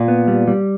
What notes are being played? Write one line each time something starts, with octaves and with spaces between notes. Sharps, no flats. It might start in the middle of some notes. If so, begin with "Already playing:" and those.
Already playing: A#2
B3
G3
G3